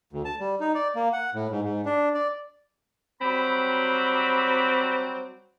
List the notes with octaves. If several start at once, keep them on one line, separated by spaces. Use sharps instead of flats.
D2
A5
G3
D#4
D5
A#3
F#5
A2
G#2
G#2
D4
D5
F#3 G3 C4 B5